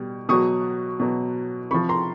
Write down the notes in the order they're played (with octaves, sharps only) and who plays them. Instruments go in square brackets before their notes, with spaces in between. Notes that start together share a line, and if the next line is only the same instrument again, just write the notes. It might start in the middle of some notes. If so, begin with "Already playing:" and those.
Already playing: [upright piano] B2 G3
B2 F#3 C#6 D#6
B2 F#3
C3 F3 B5 C#6
A#5 C6